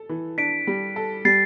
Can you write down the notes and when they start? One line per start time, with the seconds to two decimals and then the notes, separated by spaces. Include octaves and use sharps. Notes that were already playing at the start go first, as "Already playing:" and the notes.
Already playing: A4
0.09 E3
0.38 D4 B6 D7
0.67 G3
0.96 A4
1.25 G3 A6 C7